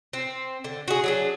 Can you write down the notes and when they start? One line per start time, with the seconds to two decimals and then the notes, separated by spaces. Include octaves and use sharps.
0.13 C4
0.64 D3
0.88 F#4 G#4
1.04 F#3 D4 G#4